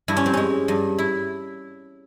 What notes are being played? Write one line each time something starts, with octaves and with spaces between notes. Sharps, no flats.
G2 E4
C#4
C4
G#3 C#4
G2
E4